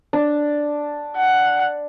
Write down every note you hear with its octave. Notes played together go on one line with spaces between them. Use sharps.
D4
F#5